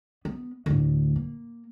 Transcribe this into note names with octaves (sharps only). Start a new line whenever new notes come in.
B3
D2 A2
A#3